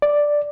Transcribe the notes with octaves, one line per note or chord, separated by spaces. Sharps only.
D5